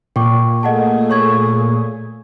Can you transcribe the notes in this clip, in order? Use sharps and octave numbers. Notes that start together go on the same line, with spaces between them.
A#2 G5 C#6 D6
A3 G#4 D#5 F#5 A5
C#5 C#6 G#6